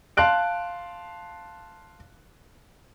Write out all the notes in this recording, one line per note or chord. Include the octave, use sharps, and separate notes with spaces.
F5 A5 C6 F#6 D7